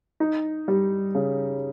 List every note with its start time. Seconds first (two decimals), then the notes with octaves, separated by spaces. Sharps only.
0.20 D#4
0.68 G3
1.15 C#3